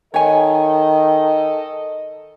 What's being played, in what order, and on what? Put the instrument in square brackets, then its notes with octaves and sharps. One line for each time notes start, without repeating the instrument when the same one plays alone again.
[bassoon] D#3 [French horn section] A4 D#5 [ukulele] C#5 G#5